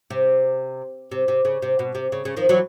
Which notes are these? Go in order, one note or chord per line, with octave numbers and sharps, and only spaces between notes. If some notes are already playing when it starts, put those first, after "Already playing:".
C3
C3
C3
C#3
C3
B2
C3
C#3
C#3
D#3 F3
E3 F#3